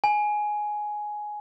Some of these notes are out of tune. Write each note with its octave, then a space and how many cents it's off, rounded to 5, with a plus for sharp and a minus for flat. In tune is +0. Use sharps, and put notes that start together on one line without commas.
G#5 +10